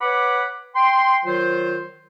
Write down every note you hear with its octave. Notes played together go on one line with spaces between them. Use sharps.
B4 C#5 F#5 B5 D6
G5 C6
D#3 F#3 F4 C5